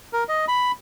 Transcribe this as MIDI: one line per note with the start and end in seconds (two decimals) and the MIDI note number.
0.13 0.24 70
0.29 0.45 75
0.48 0.72 83